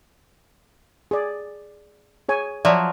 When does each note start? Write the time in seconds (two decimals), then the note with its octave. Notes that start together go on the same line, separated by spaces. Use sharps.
1.11 G#4 D5
2.29 G#4 C#5 G#5
2.65 F3 F#3 D5 E5